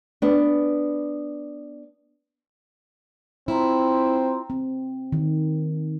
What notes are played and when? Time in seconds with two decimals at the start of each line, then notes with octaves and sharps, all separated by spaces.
0.22 B3 D4
3.48 C4 E4 F4 A#5 C6
4.50 C4
5.12 D#3